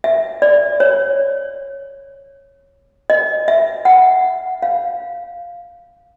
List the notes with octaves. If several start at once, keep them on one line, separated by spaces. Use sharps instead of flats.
E5
D5
C#5
D#5
E5
F#5
F5